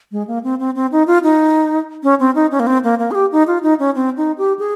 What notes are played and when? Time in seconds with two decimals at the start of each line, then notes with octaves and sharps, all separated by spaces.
0.12 G#3
0.27 A#3
0.44 C4
0.59 C4
0.75 C4
0.92 D#4
1.07 F4
1.23 D#4
2.03 C#4
2.20 C4
2.35 D#4
2.51 C#4
2.60 A#3
2.67 C4
2.84 A#3
2.99 A#3
3.11 G#4
3.15 G4
3.32 D#4
3.47 F4
3.63 D#4
3.79 C#4
3.95 C4
4.17 D#4
4.38 G4
4.59 G#4